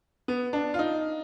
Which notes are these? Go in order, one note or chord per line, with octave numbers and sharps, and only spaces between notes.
B3
D4
F4
D#4